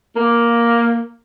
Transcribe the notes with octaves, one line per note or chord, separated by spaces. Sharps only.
A#3